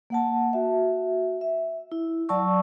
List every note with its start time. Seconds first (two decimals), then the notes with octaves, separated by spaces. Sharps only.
0.10 A#3 F#5 A5
0.53 F#4 E5
1.41 E5
1.92 E4
2.29 F#3 D5 A5 C#6 E6